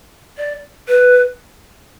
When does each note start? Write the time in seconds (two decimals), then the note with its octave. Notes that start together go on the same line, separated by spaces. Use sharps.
0.38 D5
0.88 B4